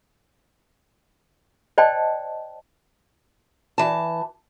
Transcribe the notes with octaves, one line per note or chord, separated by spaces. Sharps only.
C5 D5 D#5 G5 A5
E3 A5